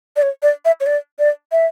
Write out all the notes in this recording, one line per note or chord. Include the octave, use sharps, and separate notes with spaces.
D5
C#5
D5
E5
C#5
D5
D5
E5